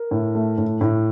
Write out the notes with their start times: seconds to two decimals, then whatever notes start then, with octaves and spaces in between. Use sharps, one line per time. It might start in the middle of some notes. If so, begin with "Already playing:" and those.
Already playing: A#4
0.11 A2
0.35 A3
0.58 A2
0.81 A2